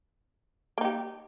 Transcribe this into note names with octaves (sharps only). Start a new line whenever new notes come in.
A#3 D#4 G4